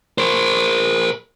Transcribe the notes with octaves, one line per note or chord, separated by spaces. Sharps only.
A#4 C5